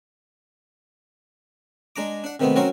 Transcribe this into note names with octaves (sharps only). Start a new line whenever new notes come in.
G#3 D4 A#5 D6
D4 F#5
C3 D#3 A3 B3 C4
F#3 C4 C#4 F#4 A#4 C5